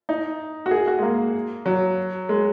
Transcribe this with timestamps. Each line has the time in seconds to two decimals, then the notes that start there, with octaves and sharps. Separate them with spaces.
0.09 D#4
0.66 F#4
0.71 G#4
0.87 F#4
0.99 G#3
1.03 A#3
1.66 F#3
2.29 G#3